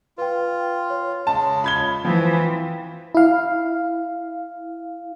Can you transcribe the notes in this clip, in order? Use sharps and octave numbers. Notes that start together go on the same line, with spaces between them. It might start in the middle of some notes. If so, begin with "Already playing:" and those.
F4 B4 G5
C#5
C#3 G#3 A5
F4 B5 F6 G#6 G7
E3 F3 C4
E4 F5